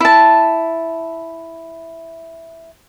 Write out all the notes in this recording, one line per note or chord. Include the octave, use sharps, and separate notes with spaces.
E4 A5